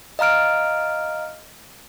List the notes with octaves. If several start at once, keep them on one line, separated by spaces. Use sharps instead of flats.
D#5 F5 A#5 F6 D7